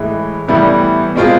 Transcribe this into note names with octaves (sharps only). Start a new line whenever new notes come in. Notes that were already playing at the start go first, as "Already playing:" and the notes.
Already playing: A2 E3 G#3
A2 E3 G3 B3 E4
B2 G#3 C4 F4 G#4